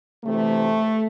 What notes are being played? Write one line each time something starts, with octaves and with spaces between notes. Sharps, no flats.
D2 C3 E3 A3